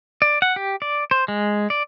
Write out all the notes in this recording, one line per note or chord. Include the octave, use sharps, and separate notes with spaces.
D5
F#5
G4
D5
C5
G#3
D5